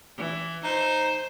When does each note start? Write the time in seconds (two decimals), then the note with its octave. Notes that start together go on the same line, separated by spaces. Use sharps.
0.17 E3
0.64 D#4 C5